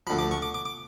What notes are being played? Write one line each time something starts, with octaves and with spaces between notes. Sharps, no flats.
D2 D3 F3 B5
D6
C#6
D6
D6
D6